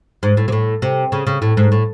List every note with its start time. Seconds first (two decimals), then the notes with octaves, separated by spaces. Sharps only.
0.23 G#2
0.37 A2
0.48 C3
0.52 A2
0.82 C3
1.12 C#3
1.27 C#3
1.42 A2
1.57 G#2
1.72 A2